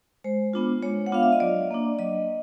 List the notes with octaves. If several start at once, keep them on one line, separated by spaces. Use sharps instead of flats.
G#3 C5
B3 D4 F4
G#3 C#5
F#5
B3 D4 F4 F5
E5
D#5
F#3 D5
A#3 D4
F#3 D#5